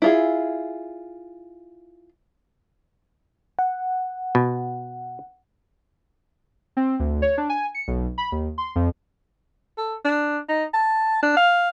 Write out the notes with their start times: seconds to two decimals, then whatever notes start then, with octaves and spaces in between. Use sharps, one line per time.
0.02 E4 F4 G#4
3.59 F#5
4.35 B2
6.77 C4
7.00 D2
7.22 C#5
7.38 D4
7.49 G#5
7.75 C#7
7.88 B1
8.18 B5
8.32 D#2
8.58 C6
8.76 F2
9.78 A4
10.04 D4
10.49 D#4
10.73 A5
11.22 D4
11.37 F5